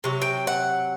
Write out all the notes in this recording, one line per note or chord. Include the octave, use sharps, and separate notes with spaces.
C3 F#3
G5
F#5